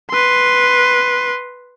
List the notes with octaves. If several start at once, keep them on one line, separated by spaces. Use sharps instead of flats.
B4 C6